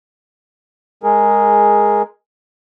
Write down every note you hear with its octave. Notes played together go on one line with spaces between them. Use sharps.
G#3 G#4 A#4